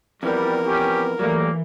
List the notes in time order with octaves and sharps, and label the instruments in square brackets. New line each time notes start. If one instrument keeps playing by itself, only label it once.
[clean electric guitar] F2 E3 B3 [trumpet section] G3 [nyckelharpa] A#4
[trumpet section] C#4 G4
[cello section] E3 [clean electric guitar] F#3 G3 A3 [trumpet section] A#3